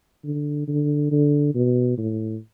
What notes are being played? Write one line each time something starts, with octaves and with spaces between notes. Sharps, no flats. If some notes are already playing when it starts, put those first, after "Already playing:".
D3
D3
D3
B2
A2